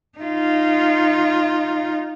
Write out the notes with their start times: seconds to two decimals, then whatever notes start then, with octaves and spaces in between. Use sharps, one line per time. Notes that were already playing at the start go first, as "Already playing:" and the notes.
0.19 D#4 F4